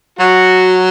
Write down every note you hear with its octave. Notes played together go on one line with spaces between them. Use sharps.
F#3 F#4